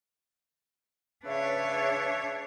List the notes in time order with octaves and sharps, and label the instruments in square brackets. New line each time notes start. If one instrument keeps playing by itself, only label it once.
[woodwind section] C#3 B4 E5 [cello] D4 C#5